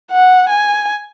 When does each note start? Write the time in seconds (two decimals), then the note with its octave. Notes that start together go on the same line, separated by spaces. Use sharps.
0.11 F#5
0.49 G#5